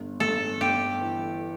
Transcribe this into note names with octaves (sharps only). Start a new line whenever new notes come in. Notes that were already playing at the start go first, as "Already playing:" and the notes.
Already playing: G1
G1 A4
G1 G4
E3